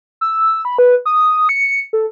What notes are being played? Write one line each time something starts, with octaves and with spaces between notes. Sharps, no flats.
E6
B5
B4
D#6
C#7
A4